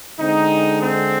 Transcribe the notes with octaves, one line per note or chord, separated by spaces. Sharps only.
D3 G#3 C4 D#4
C4